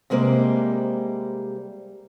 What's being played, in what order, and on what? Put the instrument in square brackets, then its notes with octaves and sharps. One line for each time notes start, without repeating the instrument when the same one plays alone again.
[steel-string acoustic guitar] C3 G3 G#3 A#3 C5